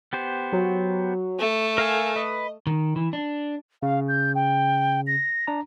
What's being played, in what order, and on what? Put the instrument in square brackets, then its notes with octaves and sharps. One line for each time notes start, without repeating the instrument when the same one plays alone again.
[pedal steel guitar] B3 G4 C5
[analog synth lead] F#3
[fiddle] A3
[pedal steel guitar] A#4 F5 G#5 [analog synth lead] E6
[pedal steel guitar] B4 [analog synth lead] D#5
[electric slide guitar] D#3
E3
D4
[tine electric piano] C#3 [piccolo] F5
[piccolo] G6
G5
A#6
[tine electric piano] D4 A#5